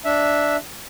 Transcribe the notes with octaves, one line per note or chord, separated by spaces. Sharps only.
D4 E5